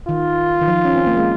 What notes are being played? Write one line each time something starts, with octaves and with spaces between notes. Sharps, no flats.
D#3 F4
D#3
F3
C#4
C4
A#3
G#3